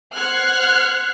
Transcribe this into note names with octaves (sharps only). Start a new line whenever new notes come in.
C5 F#5 F6 F#6 G#6 C7